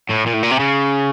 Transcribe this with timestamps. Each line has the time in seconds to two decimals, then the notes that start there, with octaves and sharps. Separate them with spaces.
0.09 A2
0.26 A#2
0.33 A2
0.43 A#2
0.51 C3
0.60 C#3